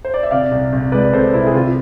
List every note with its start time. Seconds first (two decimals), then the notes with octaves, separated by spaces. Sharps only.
0.05 C5
0.14 D5
0.23 E5
0.31 C3 D5 F5
0.51 C2
0.73 C2
0.92 G#3 B4 D5
1.13 C3 A4 C5
1.33 C2 E4
1.47 G#4
1.54 C3 F4